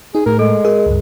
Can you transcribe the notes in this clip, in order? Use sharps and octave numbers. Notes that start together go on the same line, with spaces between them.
D#4 G#4
A2 A#4
G#3 A4
G#4 A#4
C#2 G2